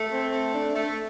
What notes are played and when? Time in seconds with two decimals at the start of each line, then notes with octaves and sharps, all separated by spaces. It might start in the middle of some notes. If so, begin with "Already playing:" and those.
Already playing: A3
0.12 C4
0.32 A3
0.53 D4
0.76 A3